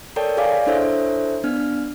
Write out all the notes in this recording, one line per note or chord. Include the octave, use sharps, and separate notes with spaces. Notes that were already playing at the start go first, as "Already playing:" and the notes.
A4 A#4 C#5 D5 G5 A5
G#4 C#5 D5 F5 G#5 D6
D4 E4 A4 C5 C#5 E5
B3 D4 F6